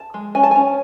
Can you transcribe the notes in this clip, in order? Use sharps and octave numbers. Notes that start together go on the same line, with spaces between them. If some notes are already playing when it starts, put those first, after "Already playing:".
Already playing: A5
G#3
C#4 G#5
A5
C#4 G#5